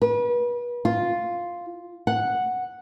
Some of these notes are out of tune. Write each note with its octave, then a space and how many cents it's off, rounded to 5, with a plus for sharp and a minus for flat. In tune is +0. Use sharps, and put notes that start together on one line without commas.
B4 -35
F4 +0
F#5 -5